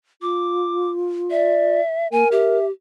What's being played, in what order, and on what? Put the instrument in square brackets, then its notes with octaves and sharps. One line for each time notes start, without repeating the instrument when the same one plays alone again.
[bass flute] F4 [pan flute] D6
[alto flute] D5 [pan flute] E5
[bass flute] A#3 [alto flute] A#4 [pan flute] G#5
[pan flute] G4 [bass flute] E5